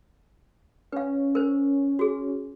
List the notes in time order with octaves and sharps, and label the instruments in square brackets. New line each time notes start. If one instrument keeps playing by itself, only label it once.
[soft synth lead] C#4 [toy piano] B4 F5
[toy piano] A#4 C5
F#4 G#4